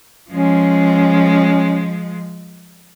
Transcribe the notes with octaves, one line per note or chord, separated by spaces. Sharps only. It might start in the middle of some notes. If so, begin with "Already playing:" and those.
F3 G#3 C#4